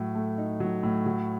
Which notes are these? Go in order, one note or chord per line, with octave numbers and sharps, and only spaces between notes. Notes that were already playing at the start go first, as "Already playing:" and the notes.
Already playing: A2 F#3
A3
D#4
F#3
A2
F#3